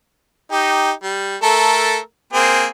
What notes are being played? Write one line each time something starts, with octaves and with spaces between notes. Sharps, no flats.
D#4 G4
G3
A3 A4 A#4
A#3 C4 G#4